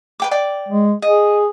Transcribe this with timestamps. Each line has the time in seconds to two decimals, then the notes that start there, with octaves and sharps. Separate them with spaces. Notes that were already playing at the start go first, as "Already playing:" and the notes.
0.20 B4 G5 D6
0.31 D5 G5 D6
0.69 G#3
1.02 G#4 D#5